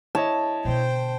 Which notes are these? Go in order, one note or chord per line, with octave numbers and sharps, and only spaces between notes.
E4 C#5 D#5 A5
B2 D3 C5 G5